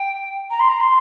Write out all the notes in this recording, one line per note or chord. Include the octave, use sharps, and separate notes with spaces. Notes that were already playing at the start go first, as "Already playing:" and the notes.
Already playing: G5
A#5
C6
A#5
C6